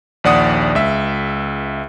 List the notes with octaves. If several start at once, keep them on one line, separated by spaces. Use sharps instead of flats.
A#1 D#2 D5 F#5 D#6
C#2 E5